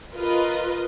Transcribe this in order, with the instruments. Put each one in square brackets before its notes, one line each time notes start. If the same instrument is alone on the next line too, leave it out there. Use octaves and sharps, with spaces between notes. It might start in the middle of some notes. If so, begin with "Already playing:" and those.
[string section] F4 A#4 B4 D#5